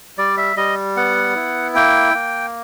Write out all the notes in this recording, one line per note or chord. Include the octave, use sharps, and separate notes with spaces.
G3 D5
E5
G3 D#5
B3 F#5
E4
A#3 G5
A#3